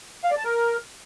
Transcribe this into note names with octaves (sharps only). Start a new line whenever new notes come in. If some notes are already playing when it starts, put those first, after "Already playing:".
F5
D5
A5
A#4